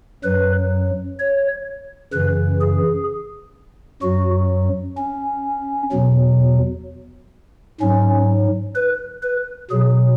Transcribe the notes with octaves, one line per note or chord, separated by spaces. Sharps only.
F#2 F#3 B4
C#5
F#2 C#3 E3 B4
G#4
F#2 F#3 F#4
C#4
E2 B2 F#3
G#2 F#3 C#4
B4
B4
B2 F#3 G#4